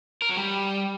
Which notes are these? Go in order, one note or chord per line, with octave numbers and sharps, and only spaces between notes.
A#4
F#3
G3